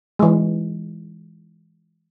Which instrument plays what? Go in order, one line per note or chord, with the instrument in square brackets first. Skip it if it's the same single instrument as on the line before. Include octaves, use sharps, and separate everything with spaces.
[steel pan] E3 G#3